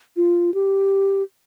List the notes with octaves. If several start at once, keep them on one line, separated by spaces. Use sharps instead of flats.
F4
G4